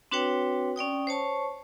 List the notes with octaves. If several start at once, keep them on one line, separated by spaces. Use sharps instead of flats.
C4 D4 F#4 B4 C#5 G5
C#4 D5 G5 D#6
C5 C#5 A5 C#6